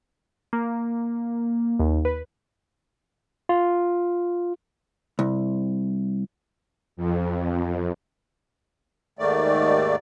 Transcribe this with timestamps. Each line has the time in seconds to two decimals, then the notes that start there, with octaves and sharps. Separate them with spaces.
0.53 A#3
1.80 D#2
2.05 B4
3.49 F4
5.19 C2
6.97 F2
9.19 D#2 G#2 D#3 A3 D5